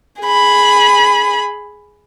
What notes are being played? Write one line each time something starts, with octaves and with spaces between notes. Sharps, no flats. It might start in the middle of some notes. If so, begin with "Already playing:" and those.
G#4 B5